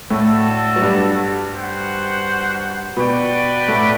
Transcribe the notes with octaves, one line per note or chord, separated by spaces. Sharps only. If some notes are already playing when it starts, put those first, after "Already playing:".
A2 A3 D4 F#4 A4
F#3
G2 G3
F#4 C5 F#5
B2 B3 F#4 B4 D5 G5
A2 A3